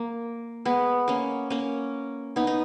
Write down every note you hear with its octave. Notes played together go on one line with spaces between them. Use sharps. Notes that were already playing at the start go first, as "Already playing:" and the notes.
Already playing: A#3
G#3 B3
A#3 C#4
A#3 C#4
B3 D#4
D#4